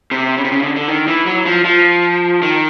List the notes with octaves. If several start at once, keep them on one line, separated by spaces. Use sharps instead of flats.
C3
C#3
C3
C#3
D3
D3
D#3
E3
F#3
F3
F3
D#3